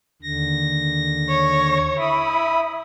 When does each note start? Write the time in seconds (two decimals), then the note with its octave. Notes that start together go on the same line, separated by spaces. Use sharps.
0.22 D#2 D3 A#6
1.29 C#5
2.00 E4 E5 B5 D#6